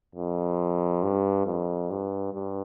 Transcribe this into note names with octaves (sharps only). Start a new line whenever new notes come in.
F2
G2
F2
G2
G2